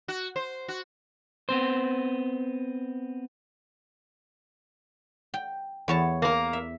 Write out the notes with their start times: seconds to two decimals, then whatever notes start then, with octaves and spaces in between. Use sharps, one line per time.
0.08 F#4
0.36 C5
0.68 F#4
1.49 B3 C4 C5
5.34 G5
5.88 E2 C#5 A5
6.22 A#3 A#4
6.53 E5